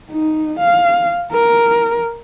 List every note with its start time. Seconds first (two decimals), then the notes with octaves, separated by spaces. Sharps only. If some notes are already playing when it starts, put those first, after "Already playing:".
0.11 D#4
0.59 F5
1.32 A#4